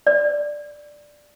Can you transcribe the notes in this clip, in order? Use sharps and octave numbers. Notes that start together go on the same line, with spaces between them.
D5